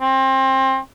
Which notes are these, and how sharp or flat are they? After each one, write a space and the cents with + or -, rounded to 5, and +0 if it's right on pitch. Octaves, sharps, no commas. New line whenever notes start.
C4 +25